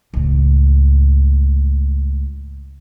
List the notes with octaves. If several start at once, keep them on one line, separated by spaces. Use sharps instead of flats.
C#2 A2